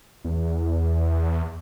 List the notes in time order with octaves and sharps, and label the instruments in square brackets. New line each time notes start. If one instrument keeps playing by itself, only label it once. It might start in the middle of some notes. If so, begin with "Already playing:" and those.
[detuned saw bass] E2